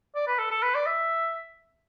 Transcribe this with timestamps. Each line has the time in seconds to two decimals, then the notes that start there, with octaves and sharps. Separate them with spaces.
0.15 D5
0.27 B4
0.39 A4
0.51 A4
0.63 B4
0.75 D5
0.86 E5